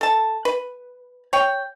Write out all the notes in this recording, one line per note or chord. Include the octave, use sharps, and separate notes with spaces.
A4 A5
B4
C#5 G5